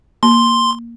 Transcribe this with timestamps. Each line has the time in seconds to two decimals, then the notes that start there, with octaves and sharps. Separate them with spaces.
0.23 A#3 C6